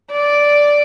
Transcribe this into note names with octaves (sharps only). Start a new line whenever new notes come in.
D5